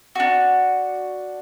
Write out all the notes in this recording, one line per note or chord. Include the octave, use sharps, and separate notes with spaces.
D4 F#4